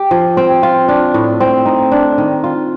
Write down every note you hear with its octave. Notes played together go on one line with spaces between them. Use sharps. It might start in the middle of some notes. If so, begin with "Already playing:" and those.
Already playing: G4
F3
C4
F4
D4
A2
C4
D#4
D4
D#3
F4